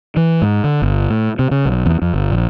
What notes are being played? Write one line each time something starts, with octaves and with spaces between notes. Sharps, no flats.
E3
G#2
D3
G1
A2
C3
C#3
B1
E2
F2
G1
A#1